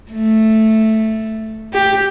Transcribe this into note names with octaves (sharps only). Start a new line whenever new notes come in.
A3
G4